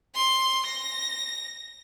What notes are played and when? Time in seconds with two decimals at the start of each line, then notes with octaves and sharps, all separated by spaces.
0.15 C6
0.66 A#6